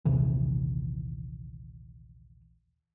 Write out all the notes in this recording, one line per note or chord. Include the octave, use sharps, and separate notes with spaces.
A#1 D#2 C3 E3